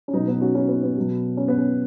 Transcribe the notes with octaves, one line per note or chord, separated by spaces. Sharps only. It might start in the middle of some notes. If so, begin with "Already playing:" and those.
C#4
B2 F#3 B3 D#4
B3 D#4
C#4 F#4
C#4 F#4
B3 D#4
B3
B2 F#3
C#4
B3
C#4